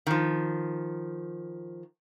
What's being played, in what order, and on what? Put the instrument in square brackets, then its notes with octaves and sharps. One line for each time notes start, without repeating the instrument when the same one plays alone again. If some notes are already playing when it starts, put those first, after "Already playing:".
[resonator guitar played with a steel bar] D#3 F3